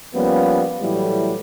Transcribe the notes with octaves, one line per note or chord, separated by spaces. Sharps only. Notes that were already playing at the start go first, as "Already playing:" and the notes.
F3 G3 A#3 B3 C#4 F4
A2 E3 F#3 G3 A3